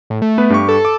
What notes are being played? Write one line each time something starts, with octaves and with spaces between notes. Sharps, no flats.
A2
A3
B3 B4
G2 G4 C#6
A4
D6